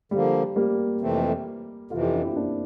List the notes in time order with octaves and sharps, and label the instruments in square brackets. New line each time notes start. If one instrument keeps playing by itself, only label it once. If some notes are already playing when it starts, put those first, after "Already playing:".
[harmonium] D3 F3 A#3 [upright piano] G3
[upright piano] G3 A#3
[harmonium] F2 C3 E3 A3 C4
[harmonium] F2 C3 E3 [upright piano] F4 A4
[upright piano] E4 G4
D4 F4
C4 E4
A#3 D4